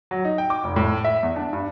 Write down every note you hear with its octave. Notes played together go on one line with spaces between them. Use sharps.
F#3
D#4
G5
D6
F1
A2
E5
E2
D4
G2